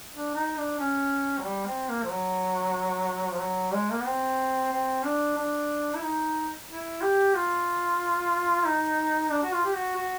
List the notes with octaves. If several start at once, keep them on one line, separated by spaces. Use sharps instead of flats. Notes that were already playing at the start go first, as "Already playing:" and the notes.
D4
D#4
D4
C#4
F#3
G3
C4
A#3
F3
F#3
F3
F#3
G#3
A#3
B3
C4
C4
D4
D4
E4
D#4
E4
G4
F4
D#4
D4
F#4
F4
G4
F#4
F#4